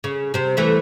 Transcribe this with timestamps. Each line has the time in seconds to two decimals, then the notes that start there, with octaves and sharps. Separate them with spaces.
0.04 C#3
0.34 C3 C4
0.57 E3 A3 B4